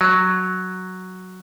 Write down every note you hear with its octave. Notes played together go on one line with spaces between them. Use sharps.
F#3